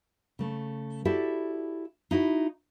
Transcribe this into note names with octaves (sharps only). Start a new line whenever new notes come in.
C#3 A3
E4 F#4 G4 A4 D5 E5
D#4 E4 F#4 D#5